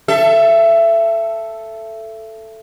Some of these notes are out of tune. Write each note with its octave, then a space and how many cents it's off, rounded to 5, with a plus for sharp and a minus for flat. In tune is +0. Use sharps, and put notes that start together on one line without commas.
A4 +0 E5 +25